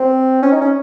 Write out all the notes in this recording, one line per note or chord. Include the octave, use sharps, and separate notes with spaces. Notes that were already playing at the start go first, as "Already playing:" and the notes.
Already playing: C4
C#4
D#4
C#4